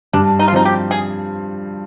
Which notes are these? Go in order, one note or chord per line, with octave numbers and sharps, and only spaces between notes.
G2 D4
D#4
F4
F3 C4 D#4
G4
G#4